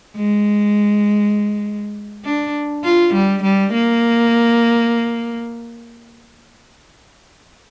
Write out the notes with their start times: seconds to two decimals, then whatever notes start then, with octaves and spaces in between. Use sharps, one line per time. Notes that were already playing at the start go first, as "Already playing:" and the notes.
0.16 G#3
2.24 D4
2.84 F4
3.14 G3
3.43 G3
3.73 A#3